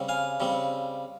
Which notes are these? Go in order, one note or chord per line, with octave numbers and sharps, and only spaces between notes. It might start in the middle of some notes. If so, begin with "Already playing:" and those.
Already playing: C#3 G3 C4
F5 G#5
C#3 G3 C4